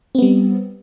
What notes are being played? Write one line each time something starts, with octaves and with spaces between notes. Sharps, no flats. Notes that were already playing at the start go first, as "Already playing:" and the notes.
G3 B3 C4